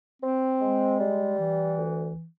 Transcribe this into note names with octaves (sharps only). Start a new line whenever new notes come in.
C4
G#3
G3
E3
D2